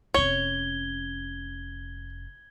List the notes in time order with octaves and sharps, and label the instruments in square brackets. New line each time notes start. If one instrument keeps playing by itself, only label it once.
[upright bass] F1 C#4 [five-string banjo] C#5 [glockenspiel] G#6 G7